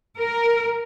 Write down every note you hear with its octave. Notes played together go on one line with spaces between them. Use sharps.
A#4